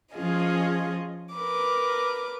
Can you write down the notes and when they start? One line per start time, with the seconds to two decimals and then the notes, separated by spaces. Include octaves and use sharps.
0.15 F3 C#4 F4 G#4 D#5
1.35 A#4 B4 D6